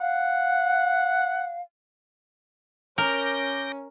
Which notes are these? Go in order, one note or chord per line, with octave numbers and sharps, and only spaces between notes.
F5 F#5
C#4 A#4 D6 G6 A#6